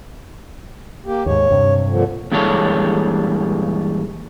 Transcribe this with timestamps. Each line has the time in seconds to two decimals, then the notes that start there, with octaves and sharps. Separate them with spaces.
1.06 A#3 G4
1.26 D#2 G#2 C#5
1.50 G2 C3
1.89 A#2 D3 F3
2.32 G2 A#2 E3 G#3 A4 C#5